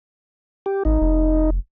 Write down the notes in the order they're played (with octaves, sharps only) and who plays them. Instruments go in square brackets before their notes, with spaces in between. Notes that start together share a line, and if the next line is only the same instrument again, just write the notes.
[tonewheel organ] G4
[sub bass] G#1 [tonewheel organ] D#4
[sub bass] F1